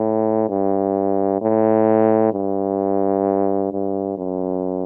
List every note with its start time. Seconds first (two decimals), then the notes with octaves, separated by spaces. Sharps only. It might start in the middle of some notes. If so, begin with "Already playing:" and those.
Already playing: A2
0.49 G2
1.41 A2
2.33 G2
3.72 G2
4.17 F#2